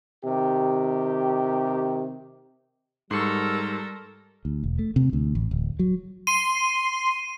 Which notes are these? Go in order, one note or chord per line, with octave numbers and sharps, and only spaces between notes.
C3 D#3 G4
G#2 G3 A4 A#4 C6 C#6 E6
D2
E1
A3
C3
D2
A1
D1
F#3
C6 D#7